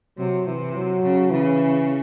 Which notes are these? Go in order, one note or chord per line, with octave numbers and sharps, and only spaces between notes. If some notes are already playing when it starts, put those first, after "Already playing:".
C3 F#3
C3 E3
F#3
C#3
C#3 E3